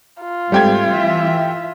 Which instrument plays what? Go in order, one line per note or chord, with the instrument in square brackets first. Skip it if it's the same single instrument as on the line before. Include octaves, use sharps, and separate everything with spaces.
[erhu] F4
[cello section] G#2 [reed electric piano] G3 C4 [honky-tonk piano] A3 G4 G#6
[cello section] E3 E5